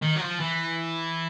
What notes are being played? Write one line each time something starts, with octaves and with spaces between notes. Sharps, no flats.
D#3
F#3
F3
E3